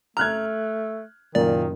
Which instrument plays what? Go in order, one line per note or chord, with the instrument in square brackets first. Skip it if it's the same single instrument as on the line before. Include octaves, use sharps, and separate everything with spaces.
[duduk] A3 [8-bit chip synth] A#5 [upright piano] F6 F#6 G#6
[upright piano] F#1 [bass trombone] A#2 [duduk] D#3 [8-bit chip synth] D5